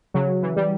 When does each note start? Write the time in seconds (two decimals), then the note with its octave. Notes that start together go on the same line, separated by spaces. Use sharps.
0.14 C#3 F#3
0.43 E3
0.56 G3